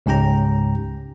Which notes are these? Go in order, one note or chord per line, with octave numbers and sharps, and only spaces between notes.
C#2 G#2 C#4 G4 G5 A#5